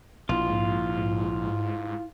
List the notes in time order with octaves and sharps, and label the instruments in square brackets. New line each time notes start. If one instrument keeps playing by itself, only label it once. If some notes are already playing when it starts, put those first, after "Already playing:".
[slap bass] A#1 [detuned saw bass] B2 [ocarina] E4 [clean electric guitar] F4
[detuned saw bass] G#2